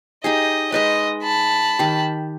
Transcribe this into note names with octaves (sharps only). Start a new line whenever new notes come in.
D#4 G4 G#4 D#5
G#3 D#4 B4 D#5
A5 B5
D#3 G4